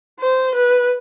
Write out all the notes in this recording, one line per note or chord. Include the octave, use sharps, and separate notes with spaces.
C5
B4